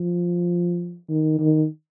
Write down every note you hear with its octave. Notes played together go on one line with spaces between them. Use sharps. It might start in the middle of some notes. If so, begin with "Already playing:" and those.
Already playing: F3
D#3
D#3